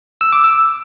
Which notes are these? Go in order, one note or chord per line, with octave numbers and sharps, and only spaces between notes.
E6
D6
E6